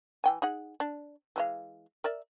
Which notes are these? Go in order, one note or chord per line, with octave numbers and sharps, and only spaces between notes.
E3 G5 G#5
D#4 G#4 F#5
D4
E3 G#3 F5
A#4 D5 E5